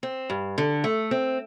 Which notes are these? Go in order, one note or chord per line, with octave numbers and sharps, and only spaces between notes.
C4
G2
D3
A3
C4